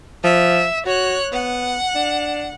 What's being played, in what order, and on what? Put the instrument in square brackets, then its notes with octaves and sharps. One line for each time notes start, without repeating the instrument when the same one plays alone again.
[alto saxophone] F3 [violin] E5
[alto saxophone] F#4 [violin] C#5 F#6
[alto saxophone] B3 [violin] F#5
[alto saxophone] D4